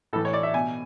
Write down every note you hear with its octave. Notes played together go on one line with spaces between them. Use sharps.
A2 E3 A4
C#5
D5
E5
B2 G#5